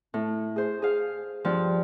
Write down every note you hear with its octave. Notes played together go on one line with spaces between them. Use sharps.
A2
G#4 C5
G#4 F5
G2 F3